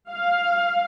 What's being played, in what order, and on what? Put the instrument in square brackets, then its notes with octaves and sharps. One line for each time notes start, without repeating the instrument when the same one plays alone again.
[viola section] F5